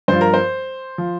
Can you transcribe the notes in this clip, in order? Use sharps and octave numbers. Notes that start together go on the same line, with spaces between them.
G2 F3 C5
A#4
C5
F3